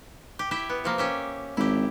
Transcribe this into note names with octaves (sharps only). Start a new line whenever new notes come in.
G4
E4 G4 E5
B3
C3 F3 A#3
C#4 G4 E5
G#1 E4 G4